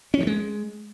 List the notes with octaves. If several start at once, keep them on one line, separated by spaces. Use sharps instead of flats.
C#4
F3
G#3